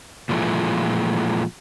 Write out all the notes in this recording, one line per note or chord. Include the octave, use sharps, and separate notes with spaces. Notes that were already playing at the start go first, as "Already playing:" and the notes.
A#2 E3 F3 G#3 A3